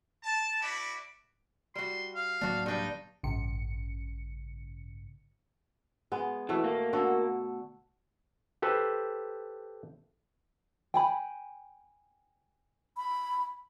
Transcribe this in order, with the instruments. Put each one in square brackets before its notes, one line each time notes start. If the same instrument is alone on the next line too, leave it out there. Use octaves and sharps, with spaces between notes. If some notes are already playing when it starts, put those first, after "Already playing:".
[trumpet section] A5
D4 E4 F#4 B4 D5
[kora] G3 F#4 [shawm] C6
[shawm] F5
[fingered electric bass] D1 F#3 A#3 [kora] D4 F#4
[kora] G2 D4 G5 [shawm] D#4
[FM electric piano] A1 G2 C#3 C#7
[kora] G#3 B3
[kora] B2 A3 [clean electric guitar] E3
[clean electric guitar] A#3
[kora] D3 F#4 A4
[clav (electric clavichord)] G4 A4 B4 C5
[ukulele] G5 G#5 B5
[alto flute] B5